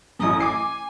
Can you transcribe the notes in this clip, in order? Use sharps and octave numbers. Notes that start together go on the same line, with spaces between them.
A1 F#2 D#6
G#5 D6 C7